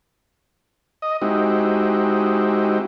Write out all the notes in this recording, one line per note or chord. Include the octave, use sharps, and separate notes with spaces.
D#5
G#3 C4 D#4 E4 F#4 G4